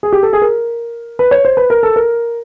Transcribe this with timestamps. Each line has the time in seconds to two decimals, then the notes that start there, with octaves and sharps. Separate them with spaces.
0.03 G#4
0.13 G4
0.23 A4
0.33 G#4
0.42 A#4
1.19 B4
1.31 C#5
1.45 C5
1.57 B4
1.70 A#4
1.83 A4
1.96 A#4